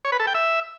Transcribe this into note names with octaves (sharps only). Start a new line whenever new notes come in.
C#5
B4
A4
G5
E5